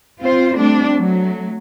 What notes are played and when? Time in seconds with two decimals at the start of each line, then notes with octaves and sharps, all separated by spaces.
0.21 C4 F4 C5
0.54 G3 A3 C4 D4
0.92 F#3 A3